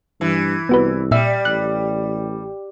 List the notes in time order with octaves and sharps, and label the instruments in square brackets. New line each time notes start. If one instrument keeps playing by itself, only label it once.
[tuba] G2 [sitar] E3
[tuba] C2 [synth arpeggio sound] B3 F#4 B4
[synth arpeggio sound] A#2 E5 [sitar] G3
[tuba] A1 [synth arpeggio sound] F#6